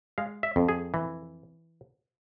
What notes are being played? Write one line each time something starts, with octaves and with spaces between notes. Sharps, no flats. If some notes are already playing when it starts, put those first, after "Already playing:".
G#3 F5
E5
F2
G#4
E3